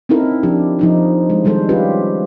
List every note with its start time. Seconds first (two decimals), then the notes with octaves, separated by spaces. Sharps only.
0.09 C4 C#4 D#4 E4 A4 A#4
0.43 F3 D4 G4
0.79 F3 D#4 E4
1.30 G#3
1.44 D#3 G3 G#3 A4 C5
1.69 C#4 F4 G4 B4